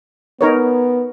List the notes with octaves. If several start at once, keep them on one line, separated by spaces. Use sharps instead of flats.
B3 D#4 A#4 C#5